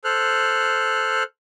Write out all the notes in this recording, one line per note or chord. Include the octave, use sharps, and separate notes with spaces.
A4 C5 F6 F#6